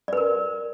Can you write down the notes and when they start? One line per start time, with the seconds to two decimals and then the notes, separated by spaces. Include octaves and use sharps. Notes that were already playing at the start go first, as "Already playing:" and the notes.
0.08 D5
0.13 B4
0.17 A#4